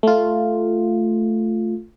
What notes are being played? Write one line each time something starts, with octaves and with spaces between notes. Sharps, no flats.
A3 F4